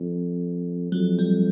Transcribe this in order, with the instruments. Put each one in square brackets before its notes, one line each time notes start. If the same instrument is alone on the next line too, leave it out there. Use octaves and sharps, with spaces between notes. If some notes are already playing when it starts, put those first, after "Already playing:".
Already playing: [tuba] F2
[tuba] F2 [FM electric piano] F#3
[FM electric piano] G3